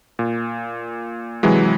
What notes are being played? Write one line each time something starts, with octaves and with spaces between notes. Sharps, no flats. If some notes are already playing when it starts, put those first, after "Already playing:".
A#2
C3 E3 F#3 G#3